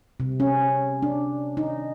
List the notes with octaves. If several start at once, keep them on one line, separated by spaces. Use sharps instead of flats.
C3
C#4
D4
D#4